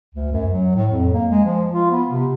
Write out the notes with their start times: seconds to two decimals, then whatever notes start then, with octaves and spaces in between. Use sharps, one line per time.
0.15 D2
0.32 F#2
0.51 F#3
0.75 A2
0.91 F2
1.13 A#3
1.30 G#3
1.45 F3
1.72 F4
1.91 B3
2.10 C3